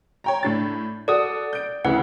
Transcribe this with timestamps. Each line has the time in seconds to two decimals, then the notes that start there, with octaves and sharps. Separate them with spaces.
0.24 C#5 G5 A#5
0.43 A2 D4 A6
1.08 F#4 A4 D5 D#6
1.53 G6 D7
1.85 D2 C#3 E3 F#5